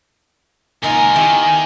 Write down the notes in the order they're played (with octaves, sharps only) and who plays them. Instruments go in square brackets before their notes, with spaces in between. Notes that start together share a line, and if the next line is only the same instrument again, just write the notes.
[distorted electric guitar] C#2 A#4 [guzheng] A#3 D#4 F4 [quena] G#5
[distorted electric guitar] D#3 [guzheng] B3 E4 G4